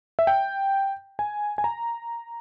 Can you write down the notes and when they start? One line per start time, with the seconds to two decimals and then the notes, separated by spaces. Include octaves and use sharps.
0.19 E5
0.27 G5
1.19 G#5
1.58 G#5
1.64 A#5